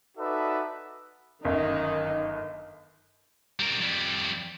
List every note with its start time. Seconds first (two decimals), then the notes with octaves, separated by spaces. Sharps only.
0.18 D#4 F#4 A4 B4 D5 E5
1.45 G1 F#2 D#3 D#4
3.59 G3 A#4
3.81 F2 G3